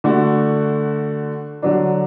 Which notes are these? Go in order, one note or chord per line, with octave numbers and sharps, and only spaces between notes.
D3 A3 F#4
D3 F#3 D4